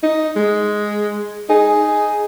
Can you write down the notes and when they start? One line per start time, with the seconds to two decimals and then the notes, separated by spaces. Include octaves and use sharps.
0.03 D#4
0.36 G#3
1.49 D#4 G#4